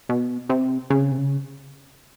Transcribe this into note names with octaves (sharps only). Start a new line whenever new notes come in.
B2
C3
C#3
C3
C#3